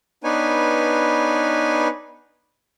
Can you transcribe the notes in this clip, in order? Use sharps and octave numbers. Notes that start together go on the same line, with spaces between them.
B3 D4 D#4 B4 C#5 G#5